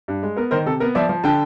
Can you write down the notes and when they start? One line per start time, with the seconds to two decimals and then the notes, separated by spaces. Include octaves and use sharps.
0.08 G2
0.23 G#3
0.36 B3 A#4
0.51 D#3 A#4 C5
0.66 C3 A4
0.80 B3 A#4
0.95 F3 D5 E5
1.09 F3
1.24 D3 G5 A5